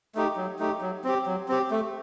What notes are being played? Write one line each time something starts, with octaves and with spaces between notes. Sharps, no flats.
A3 D#4 G4
F#3
A3 D#4 G4
F#3
C4 G4
F#3
C4 G4
A3